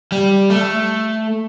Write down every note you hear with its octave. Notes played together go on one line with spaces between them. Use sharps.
G3
A3